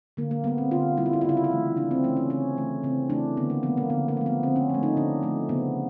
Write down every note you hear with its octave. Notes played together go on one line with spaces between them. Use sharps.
D3 A#3
A#3
G3 A#3 B3
C4
D3 F4
G3 A#3 E4
F4
E4
F4
C#3 E4
F4
E4
E3 A3
C#3 D4
C4
E3 A3 C#4
C#4
C#3 C#4
E3 A3
C#3 C4
E3 A3 D4
D3 B3
A#3
F3 A3 B3
A#3
D3 B3
A#3
F3 A3
B3
D3 C4
C#4
F3 A3
D#4
D3 D4
F3 A3
C#3 B3